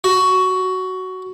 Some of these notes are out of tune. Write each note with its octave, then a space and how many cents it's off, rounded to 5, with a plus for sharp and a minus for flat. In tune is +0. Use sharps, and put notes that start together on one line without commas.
F#4 +10